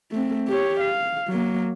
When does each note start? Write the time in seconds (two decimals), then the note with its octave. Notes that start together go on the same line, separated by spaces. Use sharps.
0.11 A3 C4
0.48 G4 C#5
0.81 F5
1.28 F#3 A#3